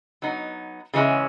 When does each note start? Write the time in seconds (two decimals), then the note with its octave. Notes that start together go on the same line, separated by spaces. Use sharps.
0.22 F#3 B3 D#4
0.94 C#3 E3 G#3 C#4 E4